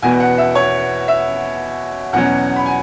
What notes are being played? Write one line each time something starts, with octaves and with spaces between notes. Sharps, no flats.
E2 B2 B3 G#5
F#5
E5
C#5
E5
E2 B2 F#3 C#4 F#5
B5
G#5